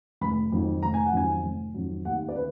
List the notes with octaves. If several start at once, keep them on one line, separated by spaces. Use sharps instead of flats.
F1 B5
F2 D#3 F#3
F1 A#5
G#5
F#5
F2 D#3 F#3 G#5
F1
F2 D#3 F#3
D#2 F#5
D5
D3 B4